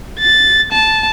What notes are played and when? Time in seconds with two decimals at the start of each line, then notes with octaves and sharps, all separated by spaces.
0.19 A6
0.72 A5